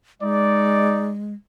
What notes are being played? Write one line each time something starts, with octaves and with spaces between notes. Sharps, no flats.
G#3 D#4 D5